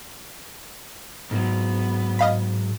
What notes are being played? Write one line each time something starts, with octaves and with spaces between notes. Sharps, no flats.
G#2 F#3 B3
D#5 F5 B5